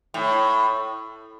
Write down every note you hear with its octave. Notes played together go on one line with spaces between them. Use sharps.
A2